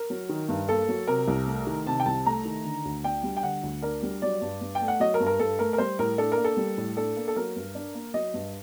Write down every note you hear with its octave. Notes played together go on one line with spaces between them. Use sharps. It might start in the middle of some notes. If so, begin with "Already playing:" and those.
Already playing: A#4
F#3
D#3
G2
A#3 A4
F#3
C3 A#4
C2
A3
D#3
C3 A5
G5
C2 A5
A3 A#5
D#3
D3
D2
D4 G5
G3
G5
D3 F#5
D2
D4 A#4
G3
F#3 D5
G2
G2
G5
A3
F#5
F#3 D#5
A#4
G2
A#4
G2 A4
A3 A#4
A#4
G3 C5
A2 A#4
D4 A4
A#4
A#3
A4
G3
A2
D4 A4
A#3
A4
F#3 A#4
G2
D4
A#3
F#3 D#5
G2